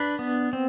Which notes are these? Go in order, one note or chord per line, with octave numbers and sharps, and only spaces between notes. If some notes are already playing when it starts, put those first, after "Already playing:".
Already playing: D4 B4
B3
C4